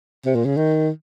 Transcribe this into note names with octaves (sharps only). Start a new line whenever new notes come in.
C3
A#2
C#3
D#3